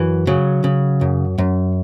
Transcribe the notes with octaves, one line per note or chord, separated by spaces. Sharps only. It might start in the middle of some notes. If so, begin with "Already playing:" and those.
Already playing: F#2 E3 F#4
C#3 F#3
C#3
F#2
F#2